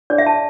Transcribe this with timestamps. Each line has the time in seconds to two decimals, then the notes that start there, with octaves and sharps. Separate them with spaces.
0.10 D4 G#4 C#5 D5
0.18 E5
0.27 A5